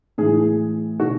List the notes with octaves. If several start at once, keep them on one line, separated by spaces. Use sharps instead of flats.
A2 E3 G#4
B2 F#4